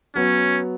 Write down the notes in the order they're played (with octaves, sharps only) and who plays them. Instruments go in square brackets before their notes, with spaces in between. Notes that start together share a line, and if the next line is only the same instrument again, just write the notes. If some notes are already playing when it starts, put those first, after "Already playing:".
[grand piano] F#3 B3 F#4 [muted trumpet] C#4